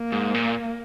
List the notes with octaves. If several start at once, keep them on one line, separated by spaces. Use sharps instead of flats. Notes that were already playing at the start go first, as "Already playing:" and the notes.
Already playing: A#3
G#2
A#2